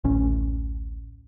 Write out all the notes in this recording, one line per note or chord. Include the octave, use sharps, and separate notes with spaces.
A1 D2 C#4